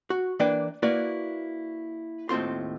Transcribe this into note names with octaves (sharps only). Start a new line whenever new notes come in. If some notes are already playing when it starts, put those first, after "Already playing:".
F#4
E3 A#3 D4 B4 D5 G5
A#3 E4 F#4 B4 D5
D#2 A2 C4 F4 C6